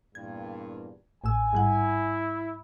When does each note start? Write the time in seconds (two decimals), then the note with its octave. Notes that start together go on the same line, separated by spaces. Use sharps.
0.15 E2 G2 A#2 G#6
1.24 A1 A2 G#5 E6
1.53 G#2 G3 E4 F#5